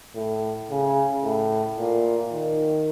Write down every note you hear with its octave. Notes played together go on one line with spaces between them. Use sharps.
A2
C#3
A2
A#2
D#3